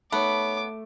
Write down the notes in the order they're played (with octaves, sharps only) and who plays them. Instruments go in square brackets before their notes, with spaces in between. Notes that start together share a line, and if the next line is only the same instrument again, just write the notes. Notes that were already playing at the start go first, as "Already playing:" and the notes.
[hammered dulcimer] A3 [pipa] B3 [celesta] D#4 C#5 [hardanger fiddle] D6